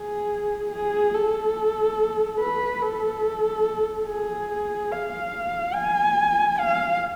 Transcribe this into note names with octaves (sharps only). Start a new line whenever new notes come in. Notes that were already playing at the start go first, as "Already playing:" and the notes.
Already playing: G#4
G#4
A4
B4
A4
G#4
F5
G#5
F5